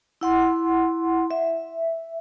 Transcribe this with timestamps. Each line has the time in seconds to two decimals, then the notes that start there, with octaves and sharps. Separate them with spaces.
0.21 E4 F#5 C6
1.31 E5